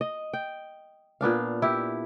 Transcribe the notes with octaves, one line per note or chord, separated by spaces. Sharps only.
D#5
G5
A#2 B3 D4 F5
E4 G4